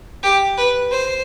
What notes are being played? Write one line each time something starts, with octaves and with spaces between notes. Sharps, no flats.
G4
B4
C5